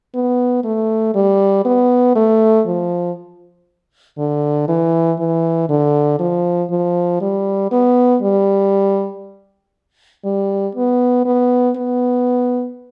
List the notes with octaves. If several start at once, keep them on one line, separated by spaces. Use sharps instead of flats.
B3
A3
G3
B3
A3
F3
D3
E3
E3
D3
F3
F3
G3
B3
G3
G3
B3
B3
B3